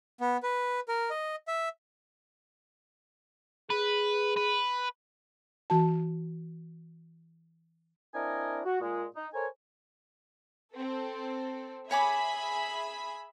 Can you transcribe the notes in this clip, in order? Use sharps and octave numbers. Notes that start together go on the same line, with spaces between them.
B3
B4
A#4
D#5
E5
G#4 B4
B4
E3 F#4 A5
C4 D4 E4 A#4 D#5 G#5
F#4
A#2 G#3
D#4
A4 A#4 C5 C#5 G#5
C4 A4
G#4 C#5 E5 G#5 B5 D6